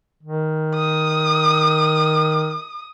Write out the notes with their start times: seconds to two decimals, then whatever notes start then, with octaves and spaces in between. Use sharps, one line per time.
0.23 D#3
0.75 D#6